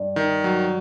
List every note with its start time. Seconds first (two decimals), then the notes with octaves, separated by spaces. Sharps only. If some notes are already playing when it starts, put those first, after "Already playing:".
Already playing: G2
0.16 D#3
0.44 F#3